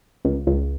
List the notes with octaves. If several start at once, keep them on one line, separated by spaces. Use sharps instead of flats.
C#2
C#2